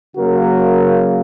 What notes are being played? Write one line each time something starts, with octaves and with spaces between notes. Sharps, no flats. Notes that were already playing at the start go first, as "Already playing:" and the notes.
C#3 F#3 A#3 F#4 A#4